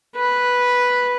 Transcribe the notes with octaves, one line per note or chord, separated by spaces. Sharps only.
B4